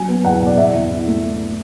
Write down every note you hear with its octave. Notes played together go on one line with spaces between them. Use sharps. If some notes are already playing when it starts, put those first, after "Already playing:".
Already playing: F#3 G#5
B3
E2 F#5
B2
D5
E2 E5
E2
E4
A3